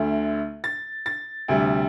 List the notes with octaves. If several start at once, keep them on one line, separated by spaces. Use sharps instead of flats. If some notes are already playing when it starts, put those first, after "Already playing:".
Already playing: D2 D3 A3
A6
A6
D2 C3 G3